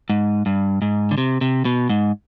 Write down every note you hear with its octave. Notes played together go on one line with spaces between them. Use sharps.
G#2
G2
G#2
D3
C3
C3
B2
G#2